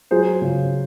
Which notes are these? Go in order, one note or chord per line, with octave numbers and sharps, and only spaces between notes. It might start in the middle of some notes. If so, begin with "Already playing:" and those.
F#3 G#4 C5
C#3